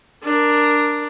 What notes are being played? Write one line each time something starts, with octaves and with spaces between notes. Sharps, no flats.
D4 A#4